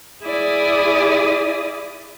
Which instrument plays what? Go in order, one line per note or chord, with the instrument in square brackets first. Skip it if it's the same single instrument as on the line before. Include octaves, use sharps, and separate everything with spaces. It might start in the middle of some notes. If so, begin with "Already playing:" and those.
[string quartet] E4 G#4 D5 D#6